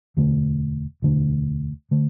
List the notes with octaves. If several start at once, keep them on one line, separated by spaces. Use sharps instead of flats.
E1 D2 D3 A3
E1 D2 D3 A3
D3 A3